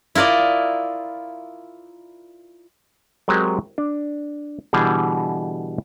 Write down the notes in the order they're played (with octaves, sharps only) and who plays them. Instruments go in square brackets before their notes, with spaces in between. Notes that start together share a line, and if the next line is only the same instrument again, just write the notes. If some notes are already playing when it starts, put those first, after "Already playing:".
[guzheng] E4 F4 A#4 D5 D#5
[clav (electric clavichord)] F#3 G#3 C4 G4 A#4
D4
B2 D3 E3 G3 G#4